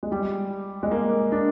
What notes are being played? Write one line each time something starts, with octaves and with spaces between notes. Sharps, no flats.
G#3
G3
G#3
A#3
D4